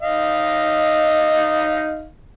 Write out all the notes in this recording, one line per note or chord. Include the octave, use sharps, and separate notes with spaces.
D#4 D#5 F5